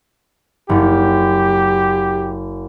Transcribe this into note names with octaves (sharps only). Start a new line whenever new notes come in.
F#1 G4